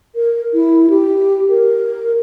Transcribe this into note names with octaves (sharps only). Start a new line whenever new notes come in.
A#4
E4
G4
A#4